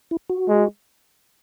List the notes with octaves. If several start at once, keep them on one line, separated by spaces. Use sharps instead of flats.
E4
F#4
G#3